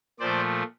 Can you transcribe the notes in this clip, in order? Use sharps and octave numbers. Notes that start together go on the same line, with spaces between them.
A#2 F3 A3 C5 D5